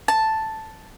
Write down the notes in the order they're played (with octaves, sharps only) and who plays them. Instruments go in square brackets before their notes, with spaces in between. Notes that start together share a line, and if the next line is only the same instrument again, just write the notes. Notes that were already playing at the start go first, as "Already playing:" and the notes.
[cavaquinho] A5